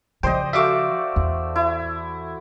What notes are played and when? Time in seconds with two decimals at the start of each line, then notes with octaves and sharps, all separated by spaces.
0.23 C#3 F3 C5 D5 D#5 G5 C6
0.53 A3 F#4 D5 E5 F5 D6
1.16 E2
1.56 E4